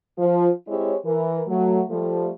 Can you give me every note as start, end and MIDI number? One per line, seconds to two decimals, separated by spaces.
0.18 0.50 53
0.68 0.95 56
0.68 0.95 60
0.68 0.95 64
0.68 0.95 67
0.68 0.95 73
1.06 1.41 52
1.06 1.41 70
1.48 1.81 54
1.48 1.81 57
1.90 2.30 53
1.90 2.30 55
1.90 2.30 57